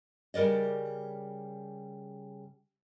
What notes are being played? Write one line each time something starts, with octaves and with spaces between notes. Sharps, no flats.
C#3 G3 A#4 D5 D#5